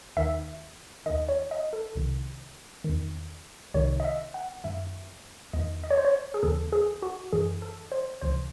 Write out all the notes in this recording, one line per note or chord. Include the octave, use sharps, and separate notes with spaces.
D#2 D#3 E5
D#2 D#3 D#5
C#5
D#5
A4
C2 C3 D#3
E2 D#3
C2 C3 D#3 C#5
D#5
E5
F#5
F#2 D#3 E5
E2 D#3 D#5
D#5
C#5
C5
C#5
G#4
D#2 C#3 E3 A4
G#4
F#4
F#2 E3 G#4
A4
C5
C#2 C3 E3 C5